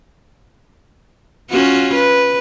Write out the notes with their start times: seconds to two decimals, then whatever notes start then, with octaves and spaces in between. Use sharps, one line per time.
1.50 C#4 F4 F#4
1.94 B4